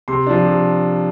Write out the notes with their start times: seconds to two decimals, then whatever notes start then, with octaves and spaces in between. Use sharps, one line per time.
0.08 C3 C6
0.27 F3 D4
0.46 C3